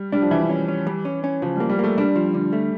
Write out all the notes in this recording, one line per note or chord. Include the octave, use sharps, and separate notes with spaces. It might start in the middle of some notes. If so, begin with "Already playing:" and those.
Already playing: G3
G3 D4
F3
E3 E4
C#4
C#4
G3
C#4
C#4
C#3 F3
G3 A#3
G3
A3 A#3
G3 D4
F3
D3
A3